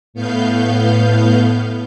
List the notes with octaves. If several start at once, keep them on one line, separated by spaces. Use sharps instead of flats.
A2 B3 F5 G6